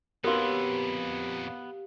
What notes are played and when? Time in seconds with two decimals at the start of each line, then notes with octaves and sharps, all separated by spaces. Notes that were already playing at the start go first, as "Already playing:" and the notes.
0.24 F2 A#2 B3 D#4 F#4 G4 A#4 F5